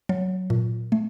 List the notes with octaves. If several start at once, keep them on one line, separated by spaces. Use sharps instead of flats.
F#3
A#2
A3